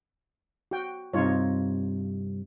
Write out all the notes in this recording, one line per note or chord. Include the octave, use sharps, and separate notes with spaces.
F#4 G5
G2 C3 D#4 F4 C#5